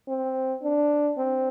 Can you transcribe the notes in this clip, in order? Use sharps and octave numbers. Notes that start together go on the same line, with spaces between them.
C4
D4
C4